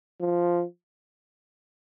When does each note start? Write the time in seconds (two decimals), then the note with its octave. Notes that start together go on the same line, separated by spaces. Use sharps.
0.20 F3